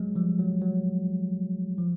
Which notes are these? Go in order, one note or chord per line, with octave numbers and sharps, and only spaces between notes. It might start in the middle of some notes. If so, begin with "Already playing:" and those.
Already playing: F#3 G#3
F3 G3
F#3
F#3
F3